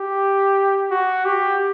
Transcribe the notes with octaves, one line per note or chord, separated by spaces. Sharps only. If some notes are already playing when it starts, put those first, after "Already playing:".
Already playing: G4
F#4
G4